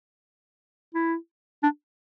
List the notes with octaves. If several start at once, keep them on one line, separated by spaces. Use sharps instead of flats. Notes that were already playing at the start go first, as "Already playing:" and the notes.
E4
D4